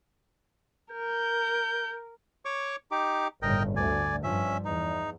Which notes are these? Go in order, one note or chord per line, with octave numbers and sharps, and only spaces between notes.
A#4 G6
C#5 C#6 D6
D#4 G4 D6
G1 A2 C#3 A#4 D#5 G5
D2 D5 G#5
G2 F3 C#4 E5
E2 D#4